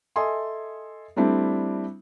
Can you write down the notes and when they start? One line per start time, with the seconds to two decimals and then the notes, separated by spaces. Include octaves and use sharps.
0.16 A4 D#5 E5 G#5 C6 D#6
1.16 G3 A3 C4 D4 E4